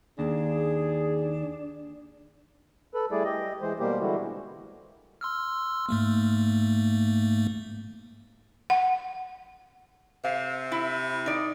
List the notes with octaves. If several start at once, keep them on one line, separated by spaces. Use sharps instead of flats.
D#2 D4 G#4
A4 B4
G3 A3 E4 G#4 D5
G4 D#5
E3 G#3 C5
B2 G3 A#3 G4 C5
D3 E3 G3 G#3 E4 F#4
C6 E6 F6
G#2 A3 A#3
F#5
C3 F5
E4
D#4 D5